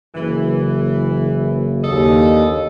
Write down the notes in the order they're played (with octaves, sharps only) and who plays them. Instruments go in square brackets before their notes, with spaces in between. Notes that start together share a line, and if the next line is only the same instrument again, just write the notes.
[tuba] F#1 [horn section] E3
[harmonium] D#2 [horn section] D4 A4 D#5